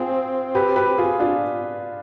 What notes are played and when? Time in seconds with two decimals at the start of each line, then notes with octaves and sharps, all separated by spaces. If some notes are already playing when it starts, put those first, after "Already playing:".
Already playing: C4 F4 G#4
0.55 G4 B4
0.76 G4 B4
0.98 F4 G#4
1.20 D4 F4